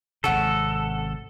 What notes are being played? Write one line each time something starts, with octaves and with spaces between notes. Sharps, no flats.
G#1 C3 C#4 F#4 A4 C#5